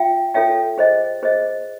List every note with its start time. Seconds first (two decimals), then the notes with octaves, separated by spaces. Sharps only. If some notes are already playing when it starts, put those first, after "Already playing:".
Already playing: F4 E5 G5
0.34 F4 A4 C#5 E5 G5
0.78 G#4 C5 D#5
1.23 G#4 C5 D#5